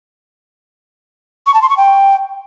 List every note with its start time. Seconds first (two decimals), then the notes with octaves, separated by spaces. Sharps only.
1.46 C#6
1.54 A5
1.62 C6
1.69 C#6
1.77 G5